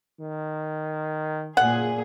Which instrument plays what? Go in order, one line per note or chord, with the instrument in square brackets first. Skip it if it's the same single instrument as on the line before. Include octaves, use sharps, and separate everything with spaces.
[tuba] D#3
[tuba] F#1 [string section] A#2 G#4 [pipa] F#5